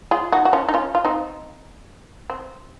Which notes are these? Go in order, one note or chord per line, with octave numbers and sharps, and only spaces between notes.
F4 G#4
D#4 F#4
F#4
C#4 F4
D#4
C#4 F4
F4
C4 D#4
C4